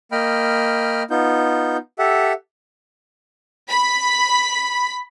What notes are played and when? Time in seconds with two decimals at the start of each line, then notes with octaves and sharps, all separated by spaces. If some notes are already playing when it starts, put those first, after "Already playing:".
0.12 A#3 D#5 G5 B5 F6
1.11 B3 D#4 F4 G6
1.99 G4 A4 E5 F#5
3.69 B5